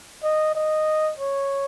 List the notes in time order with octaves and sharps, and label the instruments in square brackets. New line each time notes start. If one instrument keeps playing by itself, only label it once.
[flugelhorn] D#5
D#5
C#5